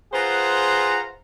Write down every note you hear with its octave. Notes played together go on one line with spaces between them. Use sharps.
F4 G#4 B4 C5 F#5 A#5